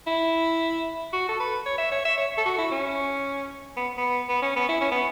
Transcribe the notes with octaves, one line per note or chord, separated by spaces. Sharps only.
E4
F#4
A4
B4
C#5
E5
C#5
E5
C#5
A4
F#4
E4
C#4
B3
B3
B3
C#4
B3
E4
C#4
B3